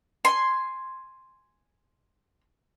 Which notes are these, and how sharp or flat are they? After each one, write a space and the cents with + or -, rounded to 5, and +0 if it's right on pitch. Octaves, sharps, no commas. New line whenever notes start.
G#5 +0 C6 +0